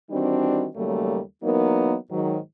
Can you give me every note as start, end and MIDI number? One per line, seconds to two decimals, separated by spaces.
0.11 0.66 51
0.11 0.66 52
0.11 0.66 55
0.11 0.66 60
0.11 0.66 62
0.11 0.66 66
0.75 1.20 39
0.75 1.20 49
0.75 1.20 54
0.75 1.20 55
0.75 1.20 57
0.75 1.20 58
1.43 1.95 52
1.43 1.95 54
1.43 1.95 58
1.43 1.95 59
1.43 1.95 63
1.43 1.95 70
2.11 2.37 44
2.11 2.37 51
2.11 2.37 54